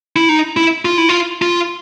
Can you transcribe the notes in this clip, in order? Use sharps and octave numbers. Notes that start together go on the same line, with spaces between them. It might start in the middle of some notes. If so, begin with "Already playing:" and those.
E4
D#4
E4
F4
E4
F4
F4